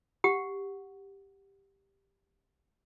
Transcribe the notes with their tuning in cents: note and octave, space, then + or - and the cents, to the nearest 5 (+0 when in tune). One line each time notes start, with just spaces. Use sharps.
G4 +5 F#5 +0